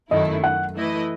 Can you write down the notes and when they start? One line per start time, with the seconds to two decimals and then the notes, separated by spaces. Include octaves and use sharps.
0.10 F#2 D#3 A3 E4 D#5
0.44 F#5
0.75 E3 A3 E4 B4 D#5